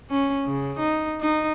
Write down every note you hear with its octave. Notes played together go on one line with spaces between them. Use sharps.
C#4
C#3
D#4
D#4